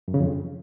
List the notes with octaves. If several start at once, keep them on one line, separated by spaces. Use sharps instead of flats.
F#2
C#3
F2